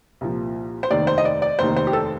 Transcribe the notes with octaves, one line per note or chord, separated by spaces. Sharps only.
C2 A#2 F3
C5
F1 D#2 D#3 D5
C5
D#5
D5
D5
F1 D#2 D#3 C5
C5
G4
A4